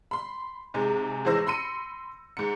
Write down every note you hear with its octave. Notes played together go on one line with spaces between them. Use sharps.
B5 C6
G#2 C3 G#3
A1 E3 G#3 C5 E6 A#6
B5 C6 C#7 D#7
G#2 C#7